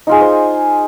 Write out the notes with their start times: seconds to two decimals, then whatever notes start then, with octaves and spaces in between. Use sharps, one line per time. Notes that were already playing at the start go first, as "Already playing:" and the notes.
0.07 D#4 F4 G#4
0.21 C5